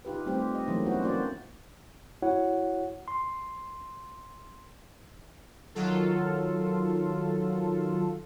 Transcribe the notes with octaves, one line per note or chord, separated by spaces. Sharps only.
D#4 F4 G4 B4
G3 A3 C4 G4 C5
D#5
E3 F#3 A3 A#3 C#4 D#4
B3 C#4 E4 F#4 B4 C5
A#3 C4 D4 F#4 C5 D5
E4 F#4 C#5 F#5
C6
D#3 F#3 F4 A4